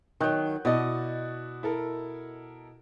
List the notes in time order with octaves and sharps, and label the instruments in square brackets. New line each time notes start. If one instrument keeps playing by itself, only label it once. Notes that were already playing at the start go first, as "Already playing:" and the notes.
[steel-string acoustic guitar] D#3 F#3 [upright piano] G5 F#6 G6
[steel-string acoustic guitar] B2 D#5 [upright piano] E4 F#4 D5
[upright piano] E4 A4 A#4